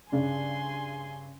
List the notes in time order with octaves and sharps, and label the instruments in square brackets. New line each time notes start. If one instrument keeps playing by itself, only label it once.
[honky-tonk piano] G2 C#3 D4 [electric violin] G#5 C6